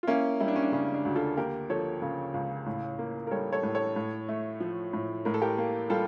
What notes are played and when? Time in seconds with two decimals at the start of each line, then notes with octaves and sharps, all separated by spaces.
0.03 F4
0.07 A#3 C#4 E4
0.41 G3 E4
0.48 D4
0.56 C#4
0.63 D4
0.72 C#3 C#4
0.94 D4
1.05 D2
1.15 F4 A4
1.37 A#3 G4 A#4
1.70 F3 A4 C#5
2.02 C#3
2.34 C#2
2.66 A2
2.99 A#3
3.27 A#4
3.31 G3 A4 C#5
3.52 A4 C#5
3.63 A2
3.75 A4 C#5
3.96 A2
4.29 A3
4.60 F3
4.93 A2
5.25 A2 A#4
5.34 A4
5.42 G4 A#4
5.58 A#3
5.90 G3 F4 A4